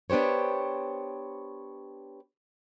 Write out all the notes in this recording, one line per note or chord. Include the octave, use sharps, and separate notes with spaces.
B3 D4 G4 C5 C#5